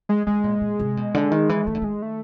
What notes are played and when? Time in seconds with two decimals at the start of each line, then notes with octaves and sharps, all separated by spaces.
0.09 G#3
0.27 D3 G#3
0.44 A#2
0.61 A#2
0.79 C3
0.97 B2
1.14 D3
1.32 D#3
1.49 E3
1.67 D#3 A3
1.75 D3
1.82 D#3 G#3
2.02 A3